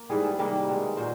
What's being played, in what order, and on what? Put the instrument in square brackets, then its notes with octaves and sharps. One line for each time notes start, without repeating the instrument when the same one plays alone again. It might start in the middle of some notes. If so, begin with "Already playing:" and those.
Already playing: [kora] A#3
G#2 E3 G3 G#4
A4
C3 D#3 G3 A#3
B2 G#3
A#2 F#3 C5